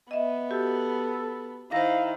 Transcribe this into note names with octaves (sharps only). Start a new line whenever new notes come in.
B3 D#5 E5
F#4 G4 A4
D#3 E4 C5 F5 A#6